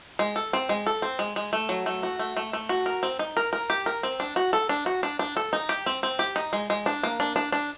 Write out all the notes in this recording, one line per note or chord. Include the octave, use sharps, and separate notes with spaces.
G#3
A4
C4
G#3
A4
C4
G#3
G#3
A3
F#3
A3
F#4
A3
A3
A3
F#4
A#4
C4
D#4
A#4
A#4
G4
A#4
C4
D4
F#4
A4
D4
F#4
D4
D4
A4
D#4
G4
C4
C4
G4
D#4
G#3
G#3
D4
A#3
D4
D4
D4